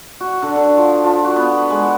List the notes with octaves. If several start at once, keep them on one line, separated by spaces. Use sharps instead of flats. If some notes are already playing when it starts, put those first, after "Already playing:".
F#4
D3
D3
F3
F3
F#4
B3
G#3